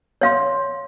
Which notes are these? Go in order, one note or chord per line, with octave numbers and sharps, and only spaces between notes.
C#5 F5 C6